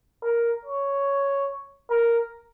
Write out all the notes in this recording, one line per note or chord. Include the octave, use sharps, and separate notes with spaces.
A#4
C#5
A#4